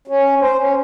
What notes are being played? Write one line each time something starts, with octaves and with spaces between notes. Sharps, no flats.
C#4
C5
C#4